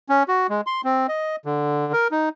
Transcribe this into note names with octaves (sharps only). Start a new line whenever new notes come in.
C#4
F#4
G#3
C6
C4
D#5
D3
A#4
D#4